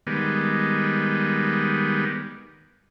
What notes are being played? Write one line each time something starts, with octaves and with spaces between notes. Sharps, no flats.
D#3 G3 G#3 B3